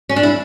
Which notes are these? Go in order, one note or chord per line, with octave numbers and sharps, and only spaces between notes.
C#4
D4
E4